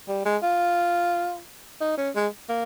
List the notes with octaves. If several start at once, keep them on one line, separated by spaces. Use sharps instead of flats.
G3
G#3
F4
D#4
C#4
G#3
A#3